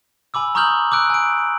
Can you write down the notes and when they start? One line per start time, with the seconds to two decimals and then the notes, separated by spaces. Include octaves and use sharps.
0.34 G#5 B5 D6 E6
0.55 A#5 C#6 D#6 F6 G6 F#7
0.92 D6 E6 F#6 D7
1.10 G#5 D7